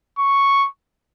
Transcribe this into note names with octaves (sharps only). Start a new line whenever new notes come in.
C#6